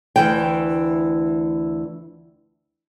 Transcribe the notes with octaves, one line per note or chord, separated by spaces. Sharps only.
D2 E3 G5